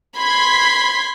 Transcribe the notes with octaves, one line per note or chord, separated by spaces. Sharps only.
B5 C6 G#6 B6